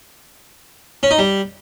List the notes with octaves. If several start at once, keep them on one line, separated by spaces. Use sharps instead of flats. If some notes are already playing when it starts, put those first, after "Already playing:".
C#4
D#4
G3